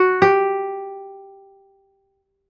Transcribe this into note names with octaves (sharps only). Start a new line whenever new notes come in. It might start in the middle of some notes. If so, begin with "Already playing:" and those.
Already playing: F#4
G4